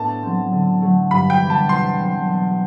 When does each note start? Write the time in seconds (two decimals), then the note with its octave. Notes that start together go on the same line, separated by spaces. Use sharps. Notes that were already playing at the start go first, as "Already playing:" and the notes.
Already playing: A2 B3 D4 A4 A5
0.22 F#3 C4
0.52 D3
0.82 F#3 A3
1.11 G2 B5
1.30 G5
1.40 E3 B3 D4 F#4
1.50 A5
1.69 B2 C6
1.99 F#3 C4
2.27 B2